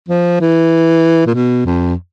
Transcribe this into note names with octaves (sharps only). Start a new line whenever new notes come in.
F3
E3
A#2
B2
F2